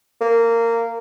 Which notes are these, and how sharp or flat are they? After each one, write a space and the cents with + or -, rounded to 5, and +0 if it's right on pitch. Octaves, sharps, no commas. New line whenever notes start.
A#3 -15